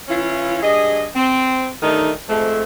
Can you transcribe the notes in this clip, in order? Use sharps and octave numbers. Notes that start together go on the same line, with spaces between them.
E3 C#4 E4 F4
G2 G#4 D#5
C4
G2 D3 D#3 A3 D#4
F2 G#2 A3